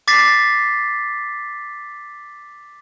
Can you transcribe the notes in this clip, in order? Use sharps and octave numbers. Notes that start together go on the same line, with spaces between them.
D6 A6 B6 C7